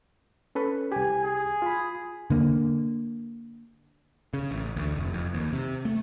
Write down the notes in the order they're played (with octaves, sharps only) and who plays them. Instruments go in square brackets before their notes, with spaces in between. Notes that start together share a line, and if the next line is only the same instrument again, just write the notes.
[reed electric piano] C#4 A4 B4
[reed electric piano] C2 G4 [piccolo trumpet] G#5
[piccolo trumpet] G#4
[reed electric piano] F4 B5
[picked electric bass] D3 A#3
C#3
A1
D2
F1
F2
D#2
C3
A3